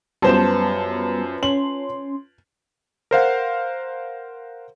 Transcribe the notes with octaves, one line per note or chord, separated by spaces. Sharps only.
F#2 G3 B3 F4 B4 C5 A5 E7
C#4 C6 F#7
A#4 C5 F5 F#5